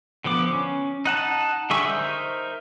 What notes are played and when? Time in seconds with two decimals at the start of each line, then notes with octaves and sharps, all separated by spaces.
0.24 D3 F3 B3 D6
0.53 C#4
1.05 D#4 F#5 A5
1.70 D3 G3 G#4 E5 C#6
1.85 D#4 A#4 C5 E5